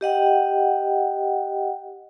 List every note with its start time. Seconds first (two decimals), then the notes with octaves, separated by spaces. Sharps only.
0.01 G4 D#5 F#5 G5